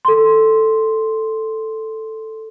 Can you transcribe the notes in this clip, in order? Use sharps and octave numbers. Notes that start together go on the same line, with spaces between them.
A4 C6